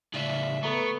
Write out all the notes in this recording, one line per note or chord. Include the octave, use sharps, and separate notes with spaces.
A2 C#3 D5 E5
A3 B3 A4 A#5 C#6